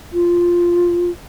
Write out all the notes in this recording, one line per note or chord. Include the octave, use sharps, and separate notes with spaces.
F4